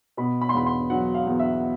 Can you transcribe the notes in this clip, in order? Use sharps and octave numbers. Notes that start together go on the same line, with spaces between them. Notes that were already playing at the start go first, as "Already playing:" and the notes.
B2 B5
B5
C6
E2 B5
C6
F#3 F#5
F5
E2
E5